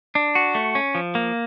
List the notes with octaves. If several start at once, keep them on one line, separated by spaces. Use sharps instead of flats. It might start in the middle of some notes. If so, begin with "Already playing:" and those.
D4
F#4
A3
C#4
F3
A#3